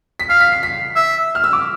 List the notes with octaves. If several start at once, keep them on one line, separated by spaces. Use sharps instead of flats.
B6
F5 C7
B6
C7
B6
E5
F6
E6
D6